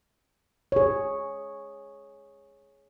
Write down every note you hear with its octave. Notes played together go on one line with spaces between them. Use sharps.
G#4 C#5